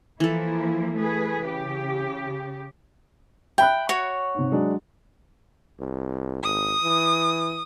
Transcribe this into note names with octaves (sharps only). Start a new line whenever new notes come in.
E3 F3 A#3 E4 A4
A3 G#4 B4
C#3 G4
E5 G5 B5 F#6
F#4 C#5
G#2 C3
F#3 G#3 D4
C2
G#1 D#6
E3